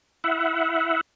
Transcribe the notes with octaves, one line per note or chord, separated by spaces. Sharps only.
E4 E5 F#5